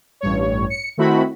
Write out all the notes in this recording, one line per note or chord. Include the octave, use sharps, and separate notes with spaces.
A1 G2 C#5
C#7
D#3 A3 C4 E4 F#4 B5